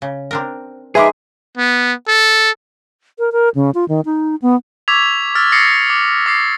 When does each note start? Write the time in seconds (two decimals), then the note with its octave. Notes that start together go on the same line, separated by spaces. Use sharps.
0.02 C#3
0.31 C4 D4 A#4
0.95 F3 G#3 D#4 G#4 B4 E5 C6 D6
1.58 B3
2.08 A4
3.19 A#4
3.32 A#4
3.55 C#3
3.75 F4
3.89 D#3
4.05 D#4
4.42 B3
4.88 C#6 D6 E6 G#6 B6 F7
5.35 E6 F6 A6
5.52 D#6 A6 A#6 C7 C#7
5.90 D6
6.26 D6 A6 C7